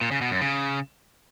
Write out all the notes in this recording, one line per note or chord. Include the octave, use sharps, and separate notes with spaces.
A#2
C#3
B2
F#2
C#3